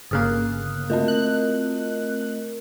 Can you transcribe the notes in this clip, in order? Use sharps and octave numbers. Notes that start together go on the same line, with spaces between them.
G1 C#3 A#3 D#6 F6 F#6
A3 C4 F4 A#4 D#5
F#6